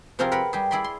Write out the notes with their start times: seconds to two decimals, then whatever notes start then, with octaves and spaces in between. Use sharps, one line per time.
0.19 C3 F3 C4 F4 G#4 A#4
0.32 A#4 B4 F#5 B5
0.53 G3 G4 G#4
0.71 E4 G#4 D5 B5 C6
0.84 C6